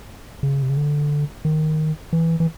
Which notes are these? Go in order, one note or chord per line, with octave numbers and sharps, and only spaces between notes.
C#3
C3
C#3
D3
D#3
E3
E3